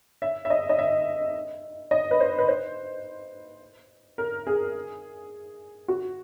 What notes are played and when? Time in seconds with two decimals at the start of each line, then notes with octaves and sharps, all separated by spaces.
0.22 E5
0.45 E5
0.50 D#5
0.69 D#5
0.79 E5
1.91 D#5
2.11 B4
2.20 C5
2.38 B4
2.48 C5
4.18 A#4
4.47 G#4
5.88 F#4